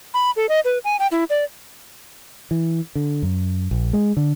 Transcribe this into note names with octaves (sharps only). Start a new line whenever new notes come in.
B5
A4
D#5
B4
G#5
G5
E4
D5
E3
D3
F#2
A#1
G#3
D3